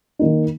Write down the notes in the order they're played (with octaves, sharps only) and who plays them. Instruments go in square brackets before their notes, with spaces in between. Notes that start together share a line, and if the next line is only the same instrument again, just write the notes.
[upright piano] D#3 A#3 D#4